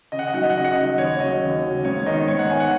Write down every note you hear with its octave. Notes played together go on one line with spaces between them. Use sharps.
C#3 D#5
F#5
D#5
F#3 D#4 F#5
D#5
F#5
C#3 D#5
F#5
D#5
F#3 D#4
D#2 C#5
C#3 F#3 D#5
D#2
C#3 F#3
G#2 C#5
D#3 B3 D#4 D#5
G#2 C#5
F#5
D#3 B3 D#4 G#5
F#5